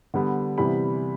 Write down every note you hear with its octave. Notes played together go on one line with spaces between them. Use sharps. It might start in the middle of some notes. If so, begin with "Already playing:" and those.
D3 G3 B3
C3 E3 G3 B3 B5